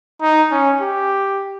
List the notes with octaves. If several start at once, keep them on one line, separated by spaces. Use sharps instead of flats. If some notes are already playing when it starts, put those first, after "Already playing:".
D#4
C#4
G4